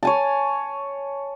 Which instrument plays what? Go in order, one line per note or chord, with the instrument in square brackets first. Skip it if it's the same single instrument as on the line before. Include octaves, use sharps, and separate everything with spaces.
[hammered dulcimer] C#5 G#5 A5